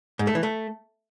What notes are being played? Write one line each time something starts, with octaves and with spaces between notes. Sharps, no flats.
G#2
A3
E3
A3